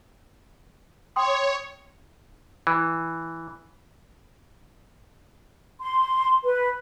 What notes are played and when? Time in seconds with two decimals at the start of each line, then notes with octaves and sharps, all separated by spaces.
1.16 C#5 G5 C6 D#6
2.67 E3
5.81 C6
6.44 B4